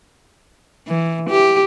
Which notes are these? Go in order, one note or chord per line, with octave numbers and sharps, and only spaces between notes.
E3
G4